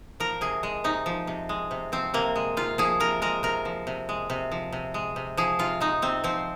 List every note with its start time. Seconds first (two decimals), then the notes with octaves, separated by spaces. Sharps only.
0.20 F3 A#4
0.41 C3 G#4
0.63 G#3
0.84 C3 D#4
1.06 F3
1.27 C3
1.49 G#3
1.71 C3
1.92 F3 C4
2.14 C3 A#3
2.36 G#3
2.57 C3 F4
2.78 F3 G#4
3.00 C3 A#4
3.22 G#3 A#4
3.43 C3 A#4
3.65 F3
3.87 C3
4.09 G#3
4.30 C3
4.51 F3
4.72 C3
4.94 G#3
5.16 C3
5.37 F3 G#4
5.59 C3 F4
5.80 G#3 D#4
6.02 C3 C4
6.24 F3 C4